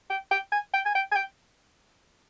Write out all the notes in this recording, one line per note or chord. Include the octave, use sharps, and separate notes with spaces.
G5
G5
G#5
G5
G#5
G5
G#5
G5